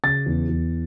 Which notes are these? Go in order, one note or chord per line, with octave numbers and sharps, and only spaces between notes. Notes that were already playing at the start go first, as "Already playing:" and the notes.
C#3 A6
E2
E2